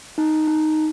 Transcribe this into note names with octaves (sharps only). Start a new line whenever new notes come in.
D#4
D#4